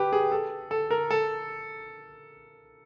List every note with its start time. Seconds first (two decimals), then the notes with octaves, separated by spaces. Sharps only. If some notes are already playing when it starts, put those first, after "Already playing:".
Already playing: G4 B4
0.13 G#4
0.32 A4
0.71 A4
0.91 A#4
1.11 A4